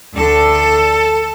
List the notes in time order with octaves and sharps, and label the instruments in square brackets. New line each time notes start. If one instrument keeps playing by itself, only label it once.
[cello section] D2 D3 A4